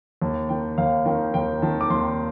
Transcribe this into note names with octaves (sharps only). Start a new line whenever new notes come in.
D#2 A5
D#3 G5
D#2 F5
D#3 G5
D#2 G5
D#3 A5
D6
D#2 C6